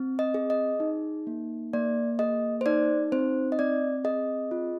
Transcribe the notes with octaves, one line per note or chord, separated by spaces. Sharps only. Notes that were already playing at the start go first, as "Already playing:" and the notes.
Already playing: C4
D#5
G#4
D#5
D#4
A#3
A#3 D5
G#4 D#5
C5
D#4 D5
C4 C5
D#5
C4 D5
G#4 D#5
F4